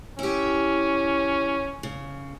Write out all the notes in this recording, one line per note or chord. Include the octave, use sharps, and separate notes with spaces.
C#4 E4 G4
C#3